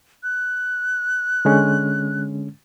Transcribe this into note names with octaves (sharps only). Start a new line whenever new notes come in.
F#6
D3 G#3 C#4